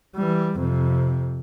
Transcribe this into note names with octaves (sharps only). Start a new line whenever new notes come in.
E3 G3
F2 C3